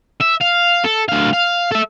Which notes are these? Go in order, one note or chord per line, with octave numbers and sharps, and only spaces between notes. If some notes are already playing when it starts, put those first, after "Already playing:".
E5
F5
A4
D2 F5
F5
A4 E5